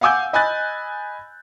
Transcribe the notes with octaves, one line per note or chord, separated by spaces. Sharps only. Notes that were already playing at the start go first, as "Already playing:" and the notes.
F5 F#5 G#5 D6 E6 G6
D#5 G#5 B5 F#6 A6